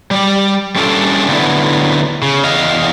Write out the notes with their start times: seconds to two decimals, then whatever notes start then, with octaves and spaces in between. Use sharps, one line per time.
0.11 G3 G4
0.76 G3 A3 C#4 D4 F4 A4
1.28 D3 F#3 A3 B3 E4
2.22 C#3
2.44 E2 D#5 F5